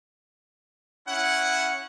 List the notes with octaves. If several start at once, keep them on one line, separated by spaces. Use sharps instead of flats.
C#4 E4 F#5